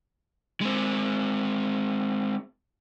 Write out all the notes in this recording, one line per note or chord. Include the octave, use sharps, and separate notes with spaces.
G#3 C4